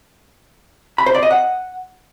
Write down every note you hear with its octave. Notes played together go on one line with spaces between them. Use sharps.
B5
C5
D5
D#5
F#5